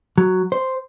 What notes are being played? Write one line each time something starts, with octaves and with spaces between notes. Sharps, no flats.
F#3
C5